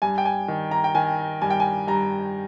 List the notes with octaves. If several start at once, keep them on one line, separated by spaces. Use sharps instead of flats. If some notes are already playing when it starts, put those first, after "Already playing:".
G2 G#5
G5
G#5
D#3
A#5
G5
D#3 G#5
G2 G#5
G5
G#5
G2 A#5